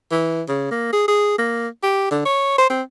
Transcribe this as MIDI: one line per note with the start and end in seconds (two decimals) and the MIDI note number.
0.11 0.42 52
0.48 0.68 49
0.71 0.91 58
0.93 1.03 68
1.08 1.35 68
1.38 1.68 58
1.83 2.10 67
2.11 2.21 50
2.25 2.56 73
2.58 2.66 72
2.70 2.82 60